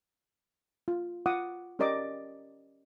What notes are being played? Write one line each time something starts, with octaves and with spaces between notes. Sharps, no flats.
F4
F4 F#5 D6 D#6
C#4 G4 A#4 D5 D#5 D6